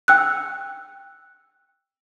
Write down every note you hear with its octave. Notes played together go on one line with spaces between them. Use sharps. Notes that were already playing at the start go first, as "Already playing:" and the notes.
G5 E6 F#6